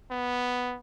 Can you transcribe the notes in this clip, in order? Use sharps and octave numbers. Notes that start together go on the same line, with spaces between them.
B3